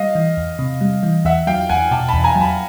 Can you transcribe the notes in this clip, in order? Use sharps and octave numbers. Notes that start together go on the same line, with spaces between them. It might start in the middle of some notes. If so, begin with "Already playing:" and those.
Already playing: G3 D#5 F5
E3
E2
C3
G3
E3
E2 E5 F#5
F#3 F5 G5
E2 F#5 G#5
B2 G5 A5
A5 B5
E2
G#5 A#5
F#3
A5 B5